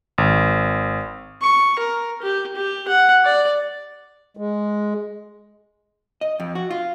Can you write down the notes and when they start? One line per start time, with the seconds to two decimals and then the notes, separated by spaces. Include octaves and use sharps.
0.18 G#1
1.42 C#6
1.79 A#4
2.22 G4
2.56 G4
2.88 F#5
3.25 D5
4.37 G#3
6.21 D#5
6.40 F2
6.55 F#4
6.71 F4